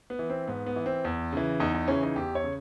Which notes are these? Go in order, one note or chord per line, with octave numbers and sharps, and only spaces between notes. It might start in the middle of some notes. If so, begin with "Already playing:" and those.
B3
E3
C4
G#2 B3
B3
E3
C4
E2
C#3 E3
E2 D#4
D#4
C#3 E3 C#4
D#4
E2 G4
C#5
C#3